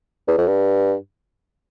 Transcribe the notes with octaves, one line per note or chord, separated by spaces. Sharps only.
E2
F2
G2